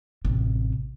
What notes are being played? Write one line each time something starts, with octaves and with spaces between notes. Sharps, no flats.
A1 C3